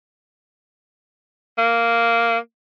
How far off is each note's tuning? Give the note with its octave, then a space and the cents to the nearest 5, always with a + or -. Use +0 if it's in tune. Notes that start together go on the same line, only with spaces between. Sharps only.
A#3 -5